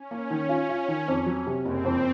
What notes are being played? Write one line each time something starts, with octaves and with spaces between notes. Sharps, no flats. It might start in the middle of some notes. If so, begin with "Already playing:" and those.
Already playing: C#4
A#3
D#3
F4
F4
D#3
F2
F#3
C3
F#1 C4
F2